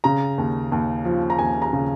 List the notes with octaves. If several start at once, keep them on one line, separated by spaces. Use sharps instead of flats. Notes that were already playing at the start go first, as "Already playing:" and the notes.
C#3 A#5
D#2
D#2
F3
A#5
D#2 G#5
A#5
C#3